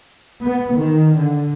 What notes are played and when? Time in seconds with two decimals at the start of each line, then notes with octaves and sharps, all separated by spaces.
0.44 B3
0.77 D#3
1.18 D3